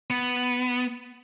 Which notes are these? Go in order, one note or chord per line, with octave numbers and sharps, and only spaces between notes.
B3